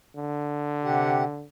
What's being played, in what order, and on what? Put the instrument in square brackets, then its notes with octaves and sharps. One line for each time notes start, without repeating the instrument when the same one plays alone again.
[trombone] D3
[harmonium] C3 G4 F#5